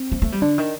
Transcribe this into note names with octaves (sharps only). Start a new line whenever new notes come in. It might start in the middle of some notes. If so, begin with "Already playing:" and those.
Already playing: C4
A3
A3
G3
D3 D4
D#3